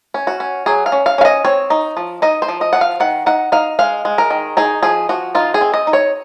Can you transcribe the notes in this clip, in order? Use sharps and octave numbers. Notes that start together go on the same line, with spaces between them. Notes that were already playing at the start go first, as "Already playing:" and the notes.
C#4
F#4
C#4
F#3 G#4
F5
C#4
F5
C#4 F5
D#5
C4 C#5
D#4
F3
D#4 D#5
C5
F3
D#5
F3 F#5
F5
D#3 F#5
D#4 F#5
D#4 F5
G#3 F5
G#3
A#4
D#3
D#4 G#4
F3 G#4
F3 F#4
D#4 F4
G#4
C4
D#5
D#4
C#5